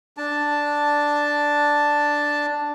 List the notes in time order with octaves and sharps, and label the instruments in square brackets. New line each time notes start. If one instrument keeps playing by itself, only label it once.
[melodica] D4 A5